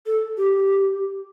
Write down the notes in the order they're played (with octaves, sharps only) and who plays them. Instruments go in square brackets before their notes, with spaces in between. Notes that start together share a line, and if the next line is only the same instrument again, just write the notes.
[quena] A4
G4